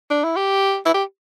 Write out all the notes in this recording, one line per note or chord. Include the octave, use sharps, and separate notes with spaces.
D4
E4
G4
E4
G4